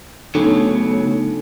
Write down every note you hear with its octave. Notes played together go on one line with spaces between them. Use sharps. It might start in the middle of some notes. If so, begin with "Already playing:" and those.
C#3 F#3 A3 B3 D4 D#4 A4 C#5